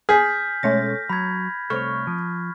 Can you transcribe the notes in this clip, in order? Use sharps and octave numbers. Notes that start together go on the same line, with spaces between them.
G#4 F6 G6 B6
B2 G#3 A3 C#4 C#5 A6 A#6
F#3 B5 G#6
C2 A3 C4 C#5 C#6 F6
F3